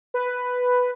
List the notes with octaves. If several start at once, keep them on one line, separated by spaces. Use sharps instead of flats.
B4